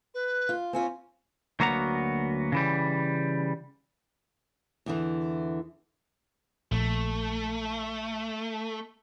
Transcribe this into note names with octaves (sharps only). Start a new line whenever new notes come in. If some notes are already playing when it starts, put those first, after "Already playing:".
B4
F4
C4 C#4 F4 G#5
D2 F#3 A#3 B3 F#4 A#5
C#3 E3 G3
E2 D3 E3
A#1 A3